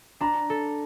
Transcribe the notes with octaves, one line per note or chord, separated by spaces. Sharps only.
D4 A#5
A4